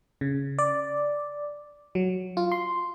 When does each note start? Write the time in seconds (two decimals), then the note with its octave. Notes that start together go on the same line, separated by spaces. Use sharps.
0.21 C#3
0.58 D5
1.95 F#3
2.37 F4
2.52 C6